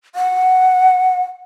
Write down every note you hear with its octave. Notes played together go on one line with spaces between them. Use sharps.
F#5